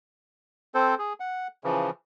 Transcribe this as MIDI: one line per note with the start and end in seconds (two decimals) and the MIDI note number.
0.75 0.95 60
0.75 0.95 69
0.75 0.95 72
0.99 1.13 68
1.20 1.48 78
1.64 1.90 49
1.64 1.90 52
1.64 1.90 53